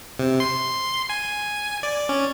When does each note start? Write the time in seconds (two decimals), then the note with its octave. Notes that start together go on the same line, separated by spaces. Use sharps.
0.19 C3
0.40 C6
1.10 G#5
1.83 D5
2.09 C#4